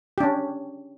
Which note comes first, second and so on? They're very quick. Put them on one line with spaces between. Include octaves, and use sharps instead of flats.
G4 D4 C#4